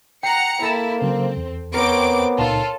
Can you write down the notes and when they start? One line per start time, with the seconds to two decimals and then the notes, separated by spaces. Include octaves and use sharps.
0.23 F#5 G5 A#5 C7 C#7
0.62 A#3 E4 A4 A6 E7
1.02 C#3 F#3 C4
1.37 E2
1.74 B3 C4 A#4 C#5 D6 D7
2.38 C#2 A#2 D#4 F4 A4 A5